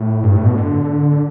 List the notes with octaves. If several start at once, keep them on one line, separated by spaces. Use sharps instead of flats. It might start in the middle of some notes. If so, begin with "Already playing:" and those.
Already playing: A2
G2
A2
B2
D3